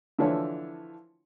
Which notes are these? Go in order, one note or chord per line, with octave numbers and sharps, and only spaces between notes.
D3 E3 F3 D4 E4 C#5